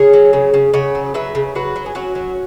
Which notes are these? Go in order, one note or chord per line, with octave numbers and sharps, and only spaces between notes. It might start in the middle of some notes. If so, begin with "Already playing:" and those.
Already playing: C#3 G#4 C#5
F#3
C#3
C#3
C#3 C#5 F#5
F#3
F#3 B4 E5
C#3
F#3 F#4 B4
F#3
G#4
F#3 C#4 F#4
F#3